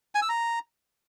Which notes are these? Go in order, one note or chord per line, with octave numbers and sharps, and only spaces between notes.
G#5
E6
A#5